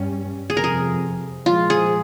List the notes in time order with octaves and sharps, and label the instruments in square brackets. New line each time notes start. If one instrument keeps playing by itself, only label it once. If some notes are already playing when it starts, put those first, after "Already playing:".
Already playing: [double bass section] G2 G3 C#4
[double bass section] F2 C3 F3 [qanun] G#4
[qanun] A#4
G#4
[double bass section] A#2 F3 G#3 [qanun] F4
[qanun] G#4